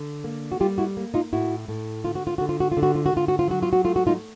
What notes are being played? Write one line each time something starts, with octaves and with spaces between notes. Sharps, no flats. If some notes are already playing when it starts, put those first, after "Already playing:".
Already playing: D3
A#3
F#4
G3 F4 G4
E4 F#4
A#3
D#4 F4
A2 E4 F#4
A2
D3 F4
F#4
F4
D3 F#4
F4
F#4
F4
D3
F#4
F4
F#4
D3 F4
F#4
F4
F#3 F#4
F4
F#4
A3 F4
F#4
D#4 F4